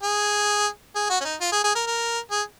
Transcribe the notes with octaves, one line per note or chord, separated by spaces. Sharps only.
G#4
G#4
F#4
C#4
D#4
F4
G#4
G#4
A#4
A#4
G#4